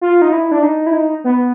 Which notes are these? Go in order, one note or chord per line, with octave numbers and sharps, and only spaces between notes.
F4
D#4
E4
D4
D#4
E4
D#4
B3